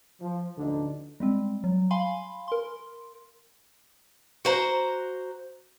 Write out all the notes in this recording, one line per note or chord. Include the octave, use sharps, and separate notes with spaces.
F3
A1 D2 D3 F3 D4 D#4
G3 G#3 C4
F#3
F5 G#5 B5 C6
A#4 C6
F#4 C5 A#5